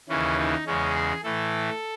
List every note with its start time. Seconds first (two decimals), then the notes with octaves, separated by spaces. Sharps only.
0.09 D#2 C#3 E3 C#4
0.38 D#4
0.66 E2 C#3 G#3 C#4
0.95 G#4
1.23 A2 E3 A3 A4